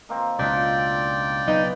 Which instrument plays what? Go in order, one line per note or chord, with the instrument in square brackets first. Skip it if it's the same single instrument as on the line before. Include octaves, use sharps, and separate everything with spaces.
[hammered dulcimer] D#3 A#3 C4
[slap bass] C#2 B2 [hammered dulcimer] D4 D#4 F4 [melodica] D5 G5
[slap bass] B1 C#3 [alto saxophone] D#4 [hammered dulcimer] B4